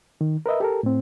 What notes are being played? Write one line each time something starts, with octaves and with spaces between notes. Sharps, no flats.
D#3
A#4 B4 D#5 E5
G4 A4 A#4
A2 C4